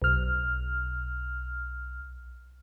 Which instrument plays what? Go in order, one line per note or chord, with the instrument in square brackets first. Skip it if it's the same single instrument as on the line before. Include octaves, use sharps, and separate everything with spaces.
[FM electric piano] B1 F6